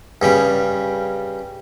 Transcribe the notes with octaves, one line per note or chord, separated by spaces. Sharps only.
G2 C#3 G3